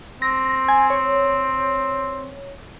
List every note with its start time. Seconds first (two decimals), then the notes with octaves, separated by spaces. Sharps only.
0.22 C4 A#6
0.68 G#5 G#6
0.90 C#5